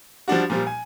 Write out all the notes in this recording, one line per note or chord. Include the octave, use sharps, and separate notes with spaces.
F3 G3 D4 F#4
A#2 F3 G3
G#5